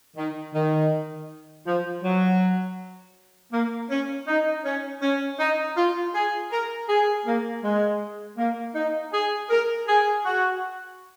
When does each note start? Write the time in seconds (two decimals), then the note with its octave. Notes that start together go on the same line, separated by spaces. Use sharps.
0.17 D#3
0.54 D#3
1.66 F3
2.03 F#3
3.52 A#3
3.90 C#4
4.28 D#4
4.64 C#4
5.02 C#4
5.39 D#4
5.77 F4
6.14 G#4
6.52 A#4
6.89 G#4
7.26 A#3
7.63 G#3
8.38 A#3
8.75 D#4
9.13 G#4
9.50 A#4
9.87 G#4
10.25 F#4